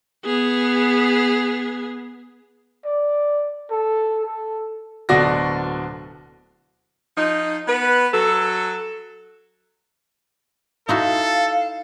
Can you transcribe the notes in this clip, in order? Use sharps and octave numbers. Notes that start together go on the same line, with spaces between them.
B3 G#4
D5
A4
A4
D1 B2 D3 F#4 D5 A#6
F3 D#4
B3 B4
F#3 A4
D#4 E4 F#4 A4 F5